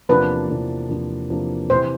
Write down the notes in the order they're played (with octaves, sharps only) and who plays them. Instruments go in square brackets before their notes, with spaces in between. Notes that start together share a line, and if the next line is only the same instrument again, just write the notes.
[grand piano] E2 C3 F3 A#3 D4 [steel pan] B4
[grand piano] E2 C3 F3 A#3 D4
E2 C3 F3 A#3 D4
E2 C3 F3 A#3 D4
[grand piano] C3 E3 [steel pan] C5